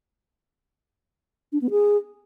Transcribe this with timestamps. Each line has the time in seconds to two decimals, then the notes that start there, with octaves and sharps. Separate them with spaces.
1.52 D4
1.61 B3
1.71 G#4